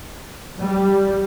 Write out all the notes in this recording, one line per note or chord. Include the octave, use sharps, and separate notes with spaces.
G3